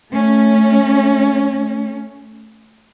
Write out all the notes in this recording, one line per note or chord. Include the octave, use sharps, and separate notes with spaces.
A3 C#4